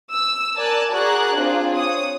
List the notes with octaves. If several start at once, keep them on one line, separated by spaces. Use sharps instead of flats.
E6
A#4 D5 G#5 A5 F#6
F#4 G#4 A#4 D5 A#5 F#6
C4 D4 F4 G#4 C5
C#5 D#6